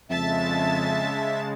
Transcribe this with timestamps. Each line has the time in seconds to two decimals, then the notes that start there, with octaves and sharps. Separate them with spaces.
0.10 F2 C#3 G#3 E5 A5 A6